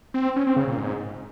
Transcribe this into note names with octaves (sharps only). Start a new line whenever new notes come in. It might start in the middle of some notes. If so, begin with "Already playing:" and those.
C4
C#4
C4
C#3
A#2
G#2